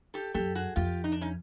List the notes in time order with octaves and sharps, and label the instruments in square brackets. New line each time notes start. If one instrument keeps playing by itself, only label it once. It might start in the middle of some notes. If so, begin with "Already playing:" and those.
[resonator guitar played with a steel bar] G4 A4
[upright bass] F#2 [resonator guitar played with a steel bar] G4 A4
[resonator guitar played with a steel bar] F#4 G#4
[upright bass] F2 [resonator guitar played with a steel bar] F4 G4
[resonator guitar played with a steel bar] D#4
D4
C#4 D#4